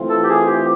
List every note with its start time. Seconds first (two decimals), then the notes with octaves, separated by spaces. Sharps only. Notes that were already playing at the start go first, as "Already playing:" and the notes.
Already playing: E3 A3 C4 F4
0.09 A4
0.23 G4
0.29 G#4
0.46 G4